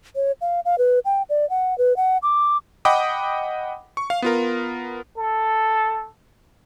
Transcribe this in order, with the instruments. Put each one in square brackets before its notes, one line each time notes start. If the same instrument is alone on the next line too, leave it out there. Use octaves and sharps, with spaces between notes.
[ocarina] C#5
F5
F5
B4
G5
D5
F#5
B4
F#5
D6
[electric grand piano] D#5 F#5 G5 B5 D6 D#6
C#6
F5
B3 F4 A#4
[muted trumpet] A4